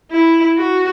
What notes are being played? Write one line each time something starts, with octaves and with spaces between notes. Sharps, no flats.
E4
F#4